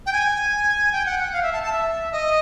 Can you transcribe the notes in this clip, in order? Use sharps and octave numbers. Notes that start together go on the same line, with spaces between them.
G5
G#5
G5
F#5
F#5
F5
E5
A5
A5
E5
D#5